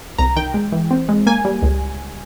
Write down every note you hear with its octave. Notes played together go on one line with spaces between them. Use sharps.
C2 A#5
D#3 G5
G#3
E3
C4
G#3
A#3 G#5
G3
C#2